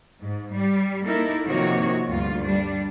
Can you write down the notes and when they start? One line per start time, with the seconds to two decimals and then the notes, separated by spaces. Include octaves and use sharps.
0.20 G#2
0.53 G3
1.04 A#3 D#4 E4 A4 A#4
1.46 C3 D#3 F3 A#3 F#4 C#5
2.07 D2 G2 F4
2.44 G3 D4